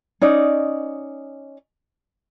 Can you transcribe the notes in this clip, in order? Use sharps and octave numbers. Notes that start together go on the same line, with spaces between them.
C#4 D#4 D5 D#5